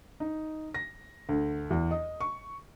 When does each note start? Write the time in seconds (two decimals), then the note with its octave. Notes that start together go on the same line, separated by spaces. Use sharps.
0.20 D#4
0.74 A#6
1.29 D2
1.71 E2
1.91 D#5
2.21 C#6